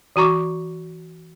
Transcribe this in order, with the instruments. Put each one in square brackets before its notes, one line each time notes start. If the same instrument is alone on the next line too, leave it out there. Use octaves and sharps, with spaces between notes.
[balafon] E3 F#4 A#5 C#6 D6